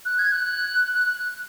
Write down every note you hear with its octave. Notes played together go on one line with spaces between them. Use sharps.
F#6
G#6
F#6
F#6